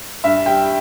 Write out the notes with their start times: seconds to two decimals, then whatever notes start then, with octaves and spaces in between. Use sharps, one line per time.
0.24 G2 E5
0.46 G3 G5